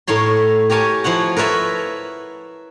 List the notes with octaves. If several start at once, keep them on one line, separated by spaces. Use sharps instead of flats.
A2 A#4 C#5 C6
G4 A#4 C#5 G#5 A5
F3 E4 C#5 F#5
A#4 B4 C#5 E5 A5